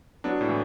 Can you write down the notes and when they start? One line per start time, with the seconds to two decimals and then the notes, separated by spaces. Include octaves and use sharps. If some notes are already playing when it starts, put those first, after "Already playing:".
0.24 F#3 B3 D4
0.41 A2
0.49 E3 A3